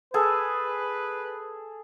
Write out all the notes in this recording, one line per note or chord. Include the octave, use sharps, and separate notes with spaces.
G#4 A4 B4